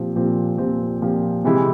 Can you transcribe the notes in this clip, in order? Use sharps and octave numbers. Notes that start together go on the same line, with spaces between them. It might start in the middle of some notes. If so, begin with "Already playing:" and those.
Already playing: A#2 F3 C4 G4
A#2 F3 C4 G4
A#2 F3 C4 G4
A#2 F3 C4 G4
C3 E3 G#3 E4 G4